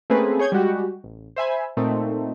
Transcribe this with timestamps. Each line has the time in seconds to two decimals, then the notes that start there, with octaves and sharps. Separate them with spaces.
0.10 A3 A#3 C4 C#4 G#4 B4
0.39 G#4 C#5 G6 G#6
0.52 G3 G#3 F#4 G4
1.04 A1
1.36 C5 E5 G#5 B5
1.77 A#2 A3 C4 D#4